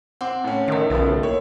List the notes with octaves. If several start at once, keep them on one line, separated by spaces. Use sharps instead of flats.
C4 F#5 C6 D6
A2 C#4
D#3 A#4 E5
B1 C#3 F3 B3
A2 D#3
A#3 A#4 C#5